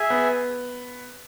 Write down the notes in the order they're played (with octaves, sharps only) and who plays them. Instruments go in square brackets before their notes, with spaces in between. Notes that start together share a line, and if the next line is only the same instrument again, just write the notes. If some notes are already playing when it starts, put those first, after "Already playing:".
Already playing: [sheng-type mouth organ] G#4 E5 G#5
[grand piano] B3